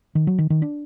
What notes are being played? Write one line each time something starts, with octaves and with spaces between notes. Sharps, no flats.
D#3
F#3
D#3
D#3
D4